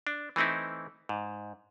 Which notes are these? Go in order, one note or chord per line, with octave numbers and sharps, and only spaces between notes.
D4
E3 A3 C4 D#4 E4
G#2